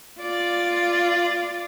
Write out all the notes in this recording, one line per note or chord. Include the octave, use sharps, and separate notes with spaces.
F4 D5